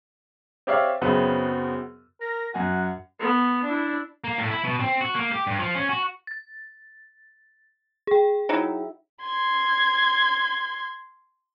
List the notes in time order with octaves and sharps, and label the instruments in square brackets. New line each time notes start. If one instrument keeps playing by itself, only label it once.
[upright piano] C4 G4 C#5 D5 E5 F5
F#2 C#3 F#3 B3 C4 F#5
[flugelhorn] A#4 [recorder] A#6
[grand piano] F#2 G#5 [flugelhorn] F#4 [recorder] F#5
[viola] B3
D4 E4
[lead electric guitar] A#3
A2
E4
B2
C4
F#4
A#3
G4
G2
F3
C#4
F#4
[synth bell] A6
G#4 G5
[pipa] F#3 D#4 E4
[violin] C6 G#6